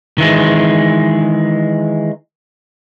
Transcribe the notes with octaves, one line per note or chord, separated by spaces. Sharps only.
D#3 E3 G#3